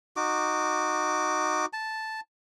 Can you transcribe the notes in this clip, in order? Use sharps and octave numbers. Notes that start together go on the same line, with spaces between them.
D#4 F#4 D6
A5